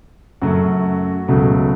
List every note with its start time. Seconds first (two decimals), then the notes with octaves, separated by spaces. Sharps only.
0.41 F#2 C#3 F#3 A3 F#4
1.28 C#2 B2 F#3 A3